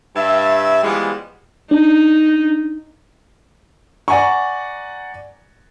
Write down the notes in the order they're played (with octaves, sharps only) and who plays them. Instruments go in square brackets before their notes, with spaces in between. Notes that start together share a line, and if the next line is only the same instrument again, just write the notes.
[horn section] G2 E5
E3 F3 G3 G#3 B3
[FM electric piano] D4 [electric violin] D#4
[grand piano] D5 F#5 G#5 A#5 C#6